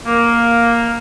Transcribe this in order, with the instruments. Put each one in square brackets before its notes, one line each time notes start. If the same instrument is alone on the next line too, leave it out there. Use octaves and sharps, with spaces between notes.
[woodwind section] A#3